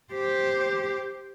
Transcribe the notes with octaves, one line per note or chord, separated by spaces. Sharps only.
G4 C5